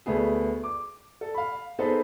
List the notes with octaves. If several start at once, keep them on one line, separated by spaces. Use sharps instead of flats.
D2 A3 B3 G#4
D6
A4
F5 B5
B3 D#4 G#4 A4 B4 C5